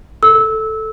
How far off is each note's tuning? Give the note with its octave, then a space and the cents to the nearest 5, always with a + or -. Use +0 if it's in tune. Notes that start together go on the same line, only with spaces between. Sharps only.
A4 +0 E6 -20